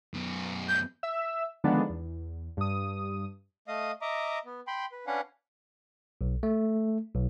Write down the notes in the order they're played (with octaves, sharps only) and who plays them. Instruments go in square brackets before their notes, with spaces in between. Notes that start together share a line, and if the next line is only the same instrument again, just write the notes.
[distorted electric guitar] F#2 B3
[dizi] G6
[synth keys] E5 E6
D3 D#3 F3 G#3 B3 D4
E2
G2 D#6
[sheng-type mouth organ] A3 D#5 F5 D#6
D#5 E5 A#5 D6
B3
G5 B5 C6
B4
C#4 D4 B4 F5 F#5
[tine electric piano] B1
A3
B1